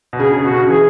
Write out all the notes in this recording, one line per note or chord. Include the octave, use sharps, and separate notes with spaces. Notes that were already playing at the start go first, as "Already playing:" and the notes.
B2
C#3 G#4
C#3
B2 F#4
C#3
E3 G#4